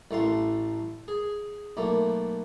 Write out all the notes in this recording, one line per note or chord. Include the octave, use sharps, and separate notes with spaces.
A1 A3 F5 C6
G#4
B1 A3 A#3